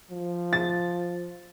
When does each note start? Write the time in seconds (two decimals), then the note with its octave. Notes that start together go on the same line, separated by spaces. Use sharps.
0.11 F3
0.53 A6